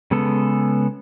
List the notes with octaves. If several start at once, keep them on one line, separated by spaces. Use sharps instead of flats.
C#3 G#3 B3 A4